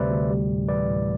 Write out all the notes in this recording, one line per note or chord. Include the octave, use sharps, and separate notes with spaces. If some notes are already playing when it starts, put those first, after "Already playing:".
Already playing: D2 C3 G3 B4 C5 D5 E5
D2
G3
A2
E3 B4 D5
A2